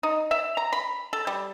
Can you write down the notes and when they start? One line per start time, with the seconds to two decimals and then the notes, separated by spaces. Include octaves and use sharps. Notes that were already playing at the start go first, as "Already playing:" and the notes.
0.03 D#4
0.31 E5
0.57 A#5
0.73 B5
1.13 A4
1.27 G3